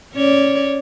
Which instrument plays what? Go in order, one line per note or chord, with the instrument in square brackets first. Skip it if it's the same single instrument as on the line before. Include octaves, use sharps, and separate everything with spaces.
[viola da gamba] C#4 C#5 D5